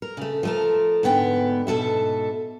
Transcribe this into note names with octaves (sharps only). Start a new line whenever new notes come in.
A#4
C#3 A3
F3 A3 A#4
G#2 D3 B3 G5
G#2 B2 F#3 A4 E5